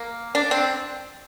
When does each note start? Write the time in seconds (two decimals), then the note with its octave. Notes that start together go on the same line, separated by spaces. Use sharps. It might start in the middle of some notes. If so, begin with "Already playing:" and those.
Already playing: A#3
0.35 D4
0.51 C4